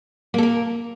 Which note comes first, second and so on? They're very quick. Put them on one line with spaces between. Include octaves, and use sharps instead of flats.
A#3 A4 A#4